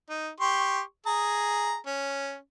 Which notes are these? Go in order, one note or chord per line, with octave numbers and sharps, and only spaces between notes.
D#4
G4 C6 C#6
G#4 A#5
C#4